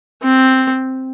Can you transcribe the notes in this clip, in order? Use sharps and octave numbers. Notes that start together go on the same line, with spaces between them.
C4